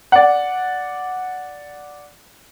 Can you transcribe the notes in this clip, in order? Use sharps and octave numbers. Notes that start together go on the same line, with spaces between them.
D5 F#5